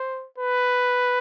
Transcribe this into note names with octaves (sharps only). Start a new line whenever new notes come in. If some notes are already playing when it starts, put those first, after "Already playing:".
Already playing: C5
B4